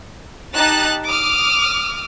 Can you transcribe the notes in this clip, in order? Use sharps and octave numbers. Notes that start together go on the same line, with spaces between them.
D#4 G4 A5 F#6 A6
D6 D#6 F6